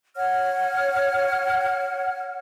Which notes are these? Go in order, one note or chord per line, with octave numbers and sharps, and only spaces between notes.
C#5 F#5 F6